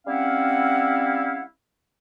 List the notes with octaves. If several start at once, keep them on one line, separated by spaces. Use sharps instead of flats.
G3 C4 C#4 E4 F5 F#5